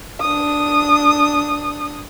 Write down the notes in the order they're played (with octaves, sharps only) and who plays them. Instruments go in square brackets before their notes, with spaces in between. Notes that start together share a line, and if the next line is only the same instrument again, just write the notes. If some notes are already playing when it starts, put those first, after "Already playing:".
[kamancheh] D4 D#6